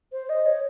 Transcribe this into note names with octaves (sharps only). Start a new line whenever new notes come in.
C5
D#5
C#5